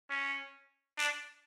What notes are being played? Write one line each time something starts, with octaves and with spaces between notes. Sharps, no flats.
C#4
D4